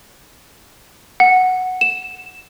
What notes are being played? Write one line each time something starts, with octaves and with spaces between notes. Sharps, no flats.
F#5
E7